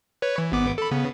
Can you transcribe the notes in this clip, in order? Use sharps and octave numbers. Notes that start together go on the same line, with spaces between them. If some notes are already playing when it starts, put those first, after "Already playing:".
B4 C#5
E3
G#1 B3 D6
A4 B5
C#3 B3